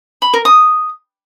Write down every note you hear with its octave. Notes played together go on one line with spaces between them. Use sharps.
B5
A#4
D#6